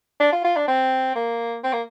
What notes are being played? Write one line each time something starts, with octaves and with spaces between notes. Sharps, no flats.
D4
F4
F4
D4
C4
A#3
C4
A#3